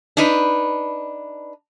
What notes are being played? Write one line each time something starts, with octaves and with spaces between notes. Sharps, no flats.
D4 D#4 B4